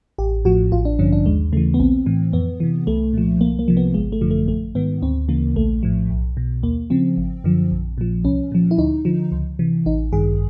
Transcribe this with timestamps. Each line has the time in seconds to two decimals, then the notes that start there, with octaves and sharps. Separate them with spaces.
0.18 A1 G4
0.45 A2 F3 F#4
0.72 A1 F4
0.85 D4
0.99 G2 D3 F3 C#4
1.12 D4
1.26 D#2 G#3
1.52 C#3 A3
1.57 E3
1.74 B3
1.79 A#1 C4
2.06 A2 E3
2.33 F2 B3
2.60 C3 E3
2.87 C2 A3
3.13 A#2 F3
3.41 C2 A#3
3.59 A#3
3.68 C3 F3
3.77 B3
3.94 G#1 G#3
4.12 A3
4.21 F#2 D3 F3
4.31 A3
4.48 A1 A3
4.75 G#2 D#3 B3
5.02 D2 C4
5.28 C#3 E3 A#3
5.56 A#1 A3
5.83 A2 F3
6.10 B1
6.37 B2
6.63 D#2 A#3
6.90 C#3 F3 C4
7.17 G#1
7.44 F#2 D3 F3
7.71 A#1
7.98 A#2 F3
8.25 C2 C#4
8.52 A#2 F3
8.71 E4
8.78 D2 D#4
9.05 D3 F3
9.32 C#2
9.59 C3 E3
9.86 A1 D#4
10.13 G2 D#3 G#4